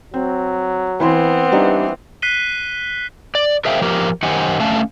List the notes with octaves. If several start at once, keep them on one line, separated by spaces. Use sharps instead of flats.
F#3 C4
E3 B3 C4 E4 C6
E3 G3 D4 D#4
F#6 B6 C7 D#7 G7
D5
G#4 A#4 C5 E5 F5 G5
F3 G4 A#4
F#2 D#3 G4 C5 F#5 G#5
D3 A3 C#4 F5 A5